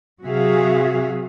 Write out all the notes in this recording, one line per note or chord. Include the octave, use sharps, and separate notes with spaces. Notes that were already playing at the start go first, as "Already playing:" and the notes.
C3 F#3 F#4 G#4 E5 F5